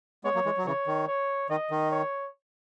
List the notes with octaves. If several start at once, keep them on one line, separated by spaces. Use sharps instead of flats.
G#3 B3 C#5
F#3 A#3
E3 G#3
F#3
C#3 E3 C#5
D#3
C#5
D#3 D#5
D#3
C#5